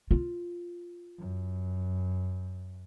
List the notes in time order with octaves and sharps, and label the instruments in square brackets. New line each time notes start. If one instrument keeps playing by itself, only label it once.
[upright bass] F4
[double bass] F#2